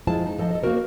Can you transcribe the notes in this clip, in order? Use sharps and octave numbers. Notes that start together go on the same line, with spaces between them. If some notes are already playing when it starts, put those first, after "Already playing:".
F2 G#3 E4 F4 C5 A5
D#4
F3 A4 D#5 A5
A4 D#5
A#3 B3 D4 F#4 A#4 C5